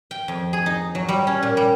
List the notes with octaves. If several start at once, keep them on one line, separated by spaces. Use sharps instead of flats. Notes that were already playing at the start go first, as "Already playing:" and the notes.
G5
F2
G#4
D#4
F#3
G3
C#4
A#2
G3